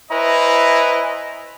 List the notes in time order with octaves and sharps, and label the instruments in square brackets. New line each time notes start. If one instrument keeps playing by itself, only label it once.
[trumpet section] E4 B4 C5 D#5 G#5 A#5